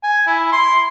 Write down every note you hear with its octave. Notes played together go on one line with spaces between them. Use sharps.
G#5
E4
C6